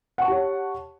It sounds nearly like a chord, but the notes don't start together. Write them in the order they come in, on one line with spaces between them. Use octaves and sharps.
F#5 C#6 A5 G4 C#5